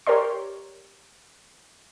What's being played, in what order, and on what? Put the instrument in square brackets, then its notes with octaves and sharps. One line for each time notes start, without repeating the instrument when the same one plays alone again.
[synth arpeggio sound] G4 A#4 C#5 D5 C6